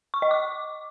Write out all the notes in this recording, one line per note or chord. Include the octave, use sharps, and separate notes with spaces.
C#6
D#5
D6